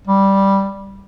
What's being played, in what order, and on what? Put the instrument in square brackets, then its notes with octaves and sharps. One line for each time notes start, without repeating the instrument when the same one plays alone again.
[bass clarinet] G3